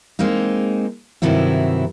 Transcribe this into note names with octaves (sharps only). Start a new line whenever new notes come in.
G#3 A#3 C4 D#4
G2 C3 D#3 F#3 C4 E4